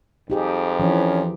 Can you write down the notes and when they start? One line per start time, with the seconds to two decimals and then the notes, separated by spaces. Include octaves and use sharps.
0.30 F2 D#4 G4 G#4
0.79 E3 F3 C#4